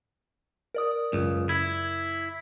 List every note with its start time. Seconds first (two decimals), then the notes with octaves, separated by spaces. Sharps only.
0.74 A#4 D5 D#6
1.13 C#2 F#2 C#3
1.49 E4 G#6